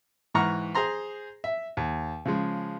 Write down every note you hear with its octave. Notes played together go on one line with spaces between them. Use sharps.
G#2 E3 F#5 A#5 C#6 F6
G#4 C5 A#5 C6
E5
D#2
C#3 F3 G#3